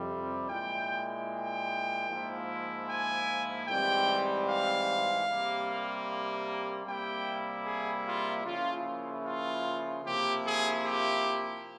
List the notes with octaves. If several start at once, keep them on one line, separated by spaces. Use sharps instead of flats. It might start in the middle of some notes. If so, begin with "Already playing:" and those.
Already playing: F2 C3 G3 C4
A#2 G#3 E4 G5
G5
G#2 F3 A#3 E4
G#5
G#2 E3 G3 C4 G5
F5
C3 G3 A#3
C3 G3 A#3 E4 G5
G#4
F4
C#3 F3 A#3 E4 F4
F4
C3 F3 A#3 E4 G4
G#4
G4